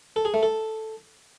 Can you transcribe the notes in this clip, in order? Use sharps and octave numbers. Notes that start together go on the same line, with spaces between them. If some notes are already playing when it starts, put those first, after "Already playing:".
A4
G#4
A3
A4